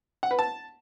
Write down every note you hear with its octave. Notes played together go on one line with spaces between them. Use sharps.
F#5
B4
A5